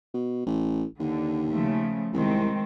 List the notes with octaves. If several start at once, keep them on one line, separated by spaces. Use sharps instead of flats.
B2
A1
D#2 D3
C#3 F3 A3
C2 D#3 G#3 C4